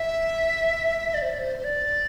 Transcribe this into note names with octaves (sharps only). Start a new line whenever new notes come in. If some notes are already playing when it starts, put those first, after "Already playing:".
Already playing: E5
D5
C5
D5
C5
C5
D5